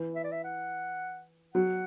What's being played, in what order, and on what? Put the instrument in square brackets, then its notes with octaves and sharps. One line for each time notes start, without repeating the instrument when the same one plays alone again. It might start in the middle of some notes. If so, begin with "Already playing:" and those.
Already playing: [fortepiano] E3
[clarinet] E5
D5
E5
F#5
[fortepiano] F#3 [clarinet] F#5